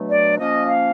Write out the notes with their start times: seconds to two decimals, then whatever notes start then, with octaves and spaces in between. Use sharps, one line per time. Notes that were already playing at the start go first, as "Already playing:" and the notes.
Already playing: B2 F#3 A3 D4
0.10 D5
0.39 F3 A#3 C#4 D#5
0.68 F5